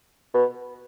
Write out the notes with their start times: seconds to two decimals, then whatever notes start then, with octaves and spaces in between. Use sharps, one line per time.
0.34 B2